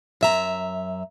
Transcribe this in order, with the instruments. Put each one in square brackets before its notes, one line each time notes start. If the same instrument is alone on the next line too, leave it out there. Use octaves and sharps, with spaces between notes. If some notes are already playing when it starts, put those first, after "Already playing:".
[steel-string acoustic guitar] F#2 E5 A#5